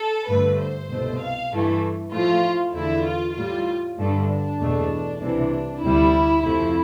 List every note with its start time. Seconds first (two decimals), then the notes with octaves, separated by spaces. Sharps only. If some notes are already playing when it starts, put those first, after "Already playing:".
Already playing: A4
0.28 G2 D3 A3 B4
0.59 C5
0.89 C2 B2 A3
1.21 F5
1.51 G2 E3 A3
2.12 A2 F3 A3 F4
2.75 E2 D3 A3 E4
3.05 F4
3.36 A2 G3 F4
3.98 G2 D3 A3
4.29 D4
4.59 E2 B2 A3
5.21 C2 C3 E3 D4
5.82 D2 C3 G3 E4
6.43 F2 C3 F3 A3 E4